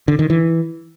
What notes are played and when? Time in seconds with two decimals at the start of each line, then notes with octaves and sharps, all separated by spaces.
0.08 D3
0.19 D#3
0.30 E3